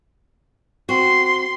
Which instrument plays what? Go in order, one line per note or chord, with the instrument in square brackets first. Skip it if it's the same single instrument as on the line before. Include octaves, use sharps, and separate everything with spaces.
[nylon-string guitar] C4 F#4 [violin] C6